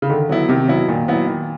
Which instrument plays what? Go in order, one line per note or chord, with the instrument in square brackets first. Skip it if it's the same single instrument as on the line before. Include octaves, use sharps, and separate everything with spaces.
[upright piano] C#3
[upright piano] D3 [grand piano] D#3
[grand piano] F#3 B3 E4
[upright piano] C3 [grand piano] D#3
[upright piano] B2 [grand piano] F#3 B3 E4
[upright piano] A#2 [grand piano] D#3
[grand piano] F#3 B3 E4
D#3